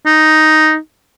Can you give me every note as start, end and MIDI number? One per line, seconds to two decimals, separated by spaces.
0.06 0.77 63